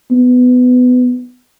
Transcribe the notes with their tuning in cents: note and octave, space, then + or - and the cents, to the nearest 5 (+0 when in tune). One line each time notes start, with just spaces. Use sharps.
B3 +15